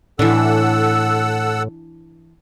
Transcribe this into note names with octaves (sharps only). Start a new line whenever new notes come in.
A2 E3 D4 A4 F#5 E6